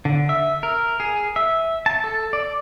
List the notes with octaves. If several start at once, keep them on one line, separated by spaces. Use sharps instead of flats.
D3
E5
A#4
G#4
E5
A5
A4
D5